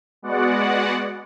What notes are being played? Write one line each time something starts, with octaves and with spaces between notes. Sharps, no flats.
G#3 B3 F#4 D5 F#5